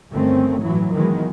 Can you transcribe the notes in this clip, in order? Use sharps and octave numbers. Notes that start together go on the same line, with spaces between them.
G1 D#3 A3 C4 C#4
A2 E3 F#3
D#3 E3 F#3 G#3 B3